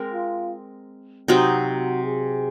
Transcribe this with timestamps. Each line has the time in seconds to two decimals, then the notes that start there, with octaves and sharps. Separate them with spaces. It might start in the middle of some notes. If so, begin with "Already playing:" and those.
Already playing: G#3 C4 A#4
0.13 F4
1.28 C3 F#3 C4 D#4 F#4
2.05 G#4